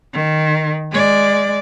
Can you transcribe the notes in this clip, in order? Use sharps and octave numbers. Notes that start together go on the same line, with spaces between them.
D#3
G#3 D5